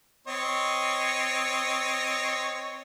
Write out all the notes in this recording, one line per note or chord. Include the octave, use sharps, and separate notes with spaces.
C4 C#5 D#5